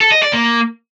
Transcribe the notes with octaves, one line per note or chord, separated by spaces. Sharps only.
A4
D#5
D5
A#3